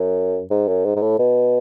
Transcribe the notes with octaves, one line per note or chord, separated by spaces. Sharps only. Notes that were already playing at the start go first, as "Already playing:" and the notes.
Already playing: F#2
G#2
F#2
G#2
G#2
A2
B2